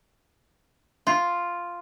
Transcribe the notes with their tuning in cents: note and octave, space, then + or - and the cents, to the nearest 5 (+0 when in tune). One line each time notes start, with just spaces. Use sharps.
F4 +0